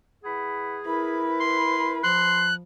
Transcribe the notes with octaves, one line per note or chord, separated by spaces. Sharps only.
E3 G#4 F#5 B5
E4 A#4 B4 B5
C6
F3 C6 F#6